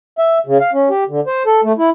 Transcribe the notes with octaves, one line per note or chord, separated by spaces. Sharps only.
E5
C#3
F5
C#4
G4
D3
C5
A4
A3
E4